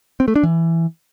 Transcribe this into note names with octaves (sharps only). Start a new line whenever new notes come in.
C4
A3
D4
E3